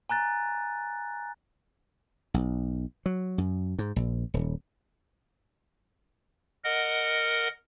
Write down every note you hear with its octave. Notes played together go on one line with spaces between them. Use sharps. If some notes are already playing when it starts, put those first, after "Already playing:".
G#5 A#5 F#6 A6
B1
F#3
F#2
G#2
A#1
D#1
A#4 D#5 F#5